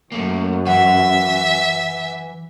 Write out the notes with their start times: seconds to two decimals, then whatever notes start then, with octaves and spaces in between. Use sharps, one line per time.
0.12 F#2 A3 A#3
0.67 E3 E5 F#5